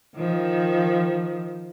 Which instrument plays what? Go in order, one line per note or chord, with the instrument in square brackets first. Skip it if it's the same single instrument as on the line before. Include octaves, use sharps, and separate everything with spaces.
[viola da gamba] D#3 F3